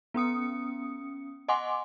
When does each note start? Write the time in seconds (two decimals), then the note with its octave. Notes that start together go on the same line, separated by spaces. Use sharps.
0.14 B3 C#4 D#6 C#7
1.48 D#5 F#5 G#5 C6 D6